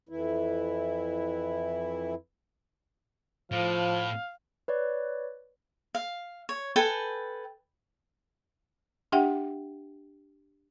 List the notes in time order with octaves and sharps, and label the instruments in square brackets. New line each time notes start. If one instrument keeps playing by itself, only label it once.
[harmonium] F2 E3 E4
[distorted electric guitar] A2 [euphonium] F3 [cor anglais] F5
[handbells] B4 C#5 D5
[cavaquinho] F5
C#5
A4 B4 G5 G#5
[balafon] D4 G4 E5 F#5 G5